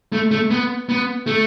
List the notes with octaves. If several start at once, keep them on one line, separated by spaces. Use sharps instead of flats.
A3
A3
B3
B3
A3